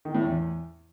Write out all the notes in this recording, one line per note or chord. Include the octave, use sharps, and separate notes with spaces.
D#3
A2
E2